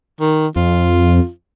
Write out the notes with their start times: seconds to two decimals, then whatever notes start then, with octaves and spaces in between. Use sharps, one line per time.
0.20 D#3
0.56 F2 F4